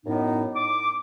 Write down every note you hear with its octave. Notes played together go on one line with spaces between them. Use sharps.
F#2 A2 B3 D#4
D6